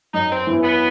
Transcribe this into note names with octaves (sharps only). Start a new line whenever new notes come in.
F#2 D#4
C4
E3 B3 E4
B3